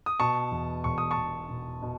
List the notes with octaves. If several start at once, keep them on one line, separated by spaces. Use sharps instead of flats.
D#6
B2 A5 C#6
E2
E1 C#6
D#6
A5 C#6
E1
B2
B2